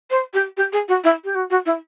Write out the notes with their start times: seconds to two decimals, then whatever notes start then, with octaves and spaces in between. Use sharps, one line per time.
0.10 C5
0.33 G4
0.57 G4
0.72 G#4
0.88 F#4
1.04 E4
1.24 G4
1.35 F#4
1.50 F#4
1.65 E4